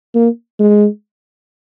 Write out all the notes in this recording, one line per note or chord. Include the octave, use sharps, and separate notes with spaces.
A#3
G#3